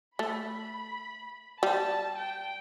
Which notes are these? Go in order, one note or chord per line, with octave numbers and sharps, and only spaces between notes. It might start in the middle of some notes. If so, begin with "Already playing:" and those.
A3 B5
G3 A5
G5